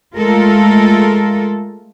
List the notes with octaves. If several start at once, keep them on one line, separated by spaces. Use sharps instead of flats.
G#3 A3 F4 A4 A#4